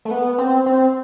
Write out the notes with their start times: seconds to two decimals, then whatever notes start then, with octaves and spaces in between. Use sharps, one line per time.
0.05 A3
0.11 B3
0.38 C4
0.66 C4